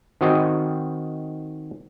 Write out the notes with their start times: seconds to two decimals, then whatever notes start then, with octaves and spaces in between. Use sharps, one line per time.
0.21 D#3 C4 F#4 D#5 G5